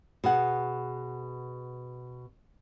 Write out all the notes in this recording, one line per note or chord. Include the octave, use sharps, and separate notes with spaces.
B2 G#4 F#5